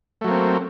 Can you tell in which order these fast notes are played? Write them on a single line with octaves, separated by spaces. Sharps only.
A3 F#3 A#3 C4